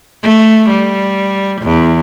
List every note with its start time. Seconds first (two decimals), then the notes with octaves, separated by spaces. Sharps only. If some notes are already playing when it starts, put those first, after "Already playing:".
0.23 A3
0.70 G3
1.62 E2